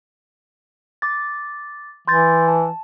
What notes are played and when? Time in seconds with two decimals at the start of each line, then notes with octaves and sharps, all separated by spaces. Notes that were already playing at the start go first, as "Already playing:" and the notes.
1.02 D6 A6
2.08 E3 C6 G6 A6
2.48 A5